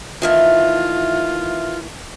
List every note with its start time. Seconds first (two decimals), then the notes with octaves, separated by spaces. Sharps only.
0.22 D#3 E3 A3 F4